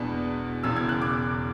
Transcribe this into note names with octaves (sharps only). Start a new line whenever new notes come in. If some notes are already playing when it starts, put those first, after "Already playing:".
Already playing: E2 B2 G#3 B3 D4
E1 E2 C#3 E6
G#6
F#6
D6